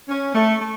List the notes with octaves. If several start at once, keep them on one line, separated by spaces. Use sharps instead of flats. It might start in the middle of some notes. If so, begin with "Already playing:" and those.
C#4
A3
A3